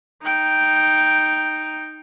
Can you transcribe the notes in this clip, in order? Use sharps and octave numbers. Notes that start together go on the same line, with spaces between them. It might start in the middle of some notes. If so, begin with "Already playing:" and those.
D#4 G5